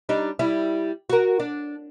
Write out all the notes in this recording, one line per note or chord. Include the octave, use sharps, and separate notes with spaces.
G3 D4 D#4
G3 E4
F#4 A#4
D4